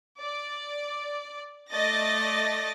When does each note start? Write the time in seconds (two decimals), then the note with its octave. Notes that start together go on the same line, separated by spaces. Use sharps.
0.21 D5
1.72 A3 D5 D#5 A6 A#6